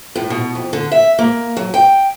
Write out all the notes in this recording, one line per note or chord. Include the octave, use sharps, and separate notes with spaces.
A2
B2
F2
D3
E5
A#3
F#3
G5